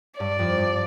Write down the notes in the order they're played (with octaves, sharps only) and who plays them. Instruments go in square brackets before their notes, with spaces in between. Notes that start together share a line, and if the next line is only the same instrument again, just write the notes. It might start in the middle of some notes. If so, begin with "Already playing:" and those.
[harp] G2 [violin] D5
[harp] F2
G2